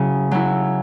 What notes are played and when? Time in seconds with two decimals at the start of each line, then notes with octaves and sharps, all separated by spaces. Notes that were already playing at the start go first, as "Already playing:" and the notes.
Already playing: C#3 F#3 E4
0.31 F#3 E4